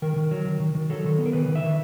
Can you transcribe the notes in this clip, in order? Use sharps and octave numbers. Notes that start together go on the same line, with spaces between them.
D#3 A#4
D#3
F#3
D#3
D#3
D#3
F#3 A4
D#3
B3
A#4
D#3 B4
D#3
E5
D#3